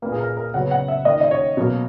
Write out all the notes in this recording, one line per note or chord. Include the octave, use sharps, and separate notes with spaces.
A#2 A#3 B4
G#4
A#4
A#4
C#3 F#3 B3 F#5
F#5
E5
D#3 A#3 D#5
D#5
C#5
B2 F#3 A#3